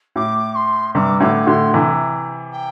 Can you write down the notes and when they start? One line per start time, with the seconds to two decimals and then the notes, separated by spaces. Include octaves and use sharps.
0.16 A2 D6
0.55 C6
0.94 G2 C3 D6
1.20 A2 D3 D6
1.47 A2 D3 C6
1.74 C3 E3
2.52 G5